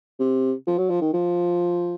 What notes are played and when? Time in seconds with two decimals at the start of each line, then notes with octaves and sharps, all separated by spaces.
0.19 C3
0.67 F3
0.78 F#3
0.90 F3
1.01 D#3
1.14 F3